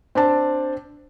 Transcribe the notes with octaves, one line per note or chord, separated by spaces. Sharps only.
C4 D4 A5